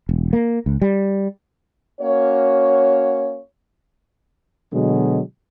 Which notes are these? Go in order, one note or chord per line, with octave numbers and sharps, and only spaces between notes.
E1
A#3
C#2
G3
A#3 C#4 F#4 C#5
B2 D3 F#3 G#3